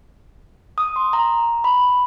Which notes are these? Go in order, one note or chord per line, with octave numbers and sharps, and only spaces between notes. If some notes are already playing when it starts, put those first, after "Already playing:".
D#6
C6
A#5
B5